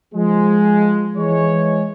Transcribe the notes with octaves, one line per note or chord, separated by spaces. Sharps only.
F3 G#3
E3 G#3 C#5